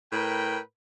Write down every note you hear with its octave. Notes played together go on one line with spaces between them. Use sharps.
A2 A#4 B4 G5